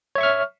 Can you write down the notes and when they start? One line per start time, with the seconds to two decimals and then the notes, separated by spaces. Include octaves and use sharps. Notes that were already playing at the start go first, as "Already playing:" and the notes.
0.15 C#5
0.18 E5
0.21 C#6
0.23 F6